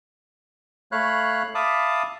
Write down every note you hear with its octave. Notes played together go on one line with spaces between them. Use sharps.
A3 C#5 F5 B5 F#6
E5 F5 A5 B5 D6 D#6